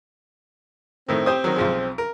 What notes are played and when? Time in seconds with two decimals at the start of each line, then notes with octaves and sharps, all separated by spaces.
1.09 A2 D#3 C4
1.26 G4 C5 D#6
1.44 D#3 F#3
1.56 B1 F3 G#3
1.98 A#4